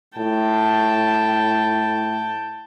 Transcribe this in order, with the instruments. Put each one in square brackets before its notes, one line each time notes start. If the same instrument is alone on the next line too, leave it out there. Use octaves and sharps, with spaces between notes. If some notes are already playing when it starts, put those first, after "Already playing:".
[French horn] A2 [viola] G5 A5